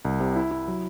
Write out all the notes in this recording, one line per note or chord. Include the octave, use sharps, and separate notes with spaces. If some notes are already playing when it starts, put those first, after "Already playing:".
C2
C3
E4
E4
F#3